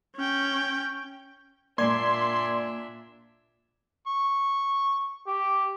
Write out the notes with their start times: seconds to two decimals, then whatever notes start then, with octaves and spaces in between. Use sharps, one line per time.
0.16 C#4 G5
1.78 A#2 A#3 D4 D5 E5 C6 G#6
4.07 C#6
5.27 G4